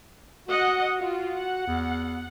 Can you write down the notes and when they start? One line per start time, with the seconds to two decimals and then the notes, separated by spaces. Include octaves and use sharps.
0.48 F#4 D#5 F#5
1.01 F4 F#4
1.35 F#5
1.67 E2